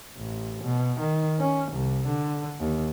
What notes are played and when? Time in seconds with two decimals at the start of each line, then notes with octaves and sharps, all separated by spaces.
0.18 A1
0.63 B2
1.00 D#3
1.40 C#4
1.72 C2
2.07 D3
2.60 D#2